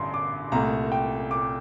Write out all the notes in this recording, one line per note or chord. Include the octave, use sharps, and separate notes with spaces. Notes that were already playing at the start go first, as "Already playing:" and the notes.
Already playing: A1 G2 D3 A#5 C6
D6
C2 A#2 A3 A#5
G5
D6